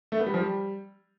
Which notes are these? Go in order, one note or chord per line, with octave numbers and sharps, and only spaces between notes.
A3
B3
G3
F3
G3